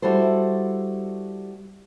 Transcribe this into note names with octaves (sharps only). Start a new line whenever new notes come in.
G3 E4 F#4 A4 C5